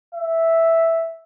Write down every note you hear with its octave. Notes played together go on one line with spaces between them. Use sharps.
E5